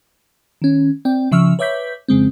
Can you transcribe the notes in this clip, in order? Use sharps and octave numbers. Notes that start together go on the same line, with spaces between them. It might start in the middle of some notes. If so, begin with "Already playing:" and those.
D#3 C#4
C4 D5 G5
C#3 F3 E5 C#6 E6 F6
B4 C#5 E5 D6 G6 B6
F2 C#3 G#3 C4